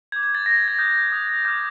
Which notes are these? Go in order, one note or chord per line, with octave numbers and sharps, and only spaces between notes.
D6 G6 G#6
G#6
A6
D6 G6 A#6
A6
G#6
D#6 F#6 G6
D#6 F#6
D6 F6 G6